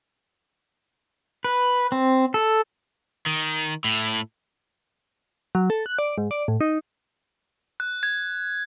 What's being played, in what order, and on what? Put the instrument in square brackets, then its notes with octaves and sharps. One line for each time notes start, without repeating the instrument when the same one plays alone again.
[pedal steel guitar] B4
C4
A4
[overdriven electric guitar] D#3
A2
[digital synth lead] F#3
A4
F#6
D5
G#2
D5
A2
D#4
[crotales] F#6
G#6